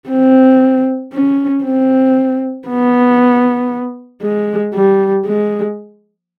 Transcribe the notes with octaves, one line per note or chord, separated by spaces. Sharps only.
C4
C#4
C4
B3
G#3
G3
G#3